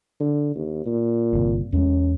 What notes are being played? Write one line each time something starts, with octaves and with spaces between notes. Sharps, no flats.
D3
D#2
A#2
G1 C3
E2 G#3 C#4